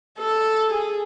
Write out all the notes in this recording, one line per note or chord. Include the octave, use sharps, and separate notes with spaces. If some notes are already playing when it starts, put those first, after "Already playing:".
A4
G#4